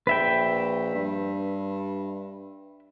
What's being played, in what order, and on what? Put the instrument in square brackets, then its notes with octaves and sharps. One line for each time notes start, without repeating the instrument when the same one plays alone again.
[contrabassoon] A#1 [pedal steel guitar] B4 E5 G5
[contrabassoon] G2